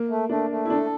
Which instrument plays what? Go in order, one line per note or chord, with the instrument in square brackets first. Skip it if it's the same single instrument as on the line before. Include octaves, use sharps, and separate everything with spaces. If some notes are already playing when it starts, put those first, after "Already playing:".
Already playing: [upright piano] A#3
[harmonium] A3
[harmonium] A3 [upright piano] D4
[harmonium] A3
[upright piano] E4
[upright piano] D4 [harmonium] A4